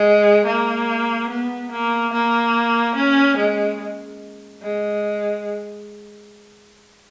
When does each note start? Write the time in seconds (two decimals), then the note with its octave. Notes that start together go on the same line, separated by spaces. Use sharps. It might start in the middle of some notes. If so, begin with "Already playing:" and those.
Already playing: G#3
0.46 A#3
1.30 B3
1.72 A#3
2.13 A#3
2.96 C#4
3.38 G#3
4.63 G#3